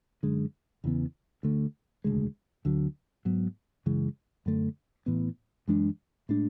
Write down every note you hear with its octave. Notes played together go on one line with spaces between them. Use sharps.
F#2 D3 G#3
E2 C#3 E3 B3
D2 D3 A3
E1 D2 C#3 G#3
D2 D3 F#3
G#2 F#3 B3
F#2 C#3 E3 G#3
F#2 D3 A3
A1 A2 E3 B3
F#2 E3 G#3 D4
A2 G#3 D4